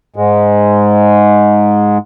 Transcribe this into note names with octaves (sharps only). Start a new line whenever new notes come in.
G#2 G#3